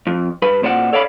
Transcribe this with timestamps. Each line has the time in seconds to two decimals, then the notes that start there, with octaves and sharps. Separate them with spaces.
0.07 F2
0.42 G2 B4 B5
0.63 A#2 C5 D5 F#5
0.93 A4 C#5 D5 F5 G5 B5